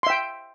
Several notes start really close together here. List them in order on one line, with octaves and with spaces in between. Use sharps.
C6 E5 G5